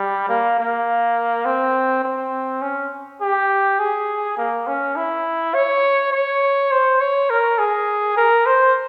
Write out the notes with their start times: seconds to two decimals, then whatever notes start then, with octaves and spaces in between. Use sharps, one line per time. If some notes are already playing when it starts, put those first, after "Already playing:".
Already playing: G3
0.29 A#3
0.59 A#3
1.46 C4
2.04 C4
2.62 C#4
3.21 G4
3.79 G#4
4.38 A#3
4.67 C#4
4.96 E4
5.54 C#5
6.12 C#5
6.72 C5
7.00 C#5
7.30 A#4
7.58 G#4
8.17 A#4
8.46 C5